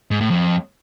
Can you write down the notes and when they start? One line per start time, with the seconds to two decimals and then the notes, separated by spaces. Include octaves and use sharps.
0.11 G#2
0.21 A2
0.30 F2